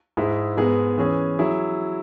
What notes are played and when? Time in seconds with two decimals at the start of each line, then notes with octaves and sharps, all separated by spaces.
0.17 G#2 G#3 E4 G#4
0.57 G#2 G#3 B3 G#4
0.98 E3 C#4 G#4
1.39 F#3 E4 G#4